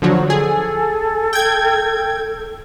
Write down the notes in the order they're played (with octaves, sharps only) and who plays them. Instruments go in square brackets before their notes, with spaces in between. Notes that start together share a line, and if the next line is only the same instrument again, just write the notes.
[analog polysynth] D3 F3 F#3
[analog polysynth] G#4 [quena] A4
[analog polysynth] G5 G#6